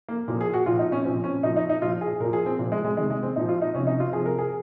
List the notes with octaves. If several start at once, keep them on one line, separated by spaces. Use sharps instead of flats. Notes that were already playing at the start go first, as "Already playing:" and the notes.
A#3
A#2 F3 A#3
G#4
F#4
A#2 F3 F4
D#4
C#4
A#2 F3 C4
C#4
A#2 F3 D#4
D#4
D#4
A#2 F3 F4
G#4
A#2 F3 A#4
G#4
C4
A#2 F3
G#3
G#3
C3 D#3 G#3
G#3
C4
A#2 F3 D#4
F4
D#4
C3 F3 C#4
D#4
F4
C3 F3 G#4
A#4
G#4